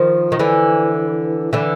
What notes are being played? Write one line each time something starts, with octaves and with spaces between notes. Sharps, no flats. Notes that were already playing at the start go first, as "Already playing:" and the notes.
Already playing: D#3 F3
D#3
D3 E3
D3 E3